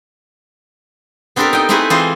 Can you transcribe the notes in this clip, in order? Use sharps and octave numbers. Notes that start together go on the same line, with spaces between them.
B3 C4 D4 G4 A4 A#4
D#4 D#5 G5
A3 C4 D#4 E4 G#4 B4
E3 C4 F4 G#4 C5 D#5